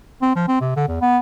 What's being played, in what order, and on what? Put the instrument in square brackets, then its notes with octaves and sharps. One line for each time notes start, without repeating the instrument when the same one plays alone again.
[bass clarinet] C4
F3
C4
C3
D3
E2
B3